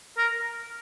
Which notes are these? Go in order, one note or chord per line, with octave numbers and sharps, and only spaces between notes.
A#4